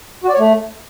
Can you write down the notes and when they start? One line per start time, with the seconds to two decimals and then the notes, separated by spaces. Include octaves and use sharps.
0.24 F#4
0.29 D5
0.34 C#5
0.39 A3